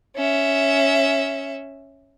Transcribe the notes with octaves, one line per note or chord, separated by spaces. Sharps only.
C#4 E5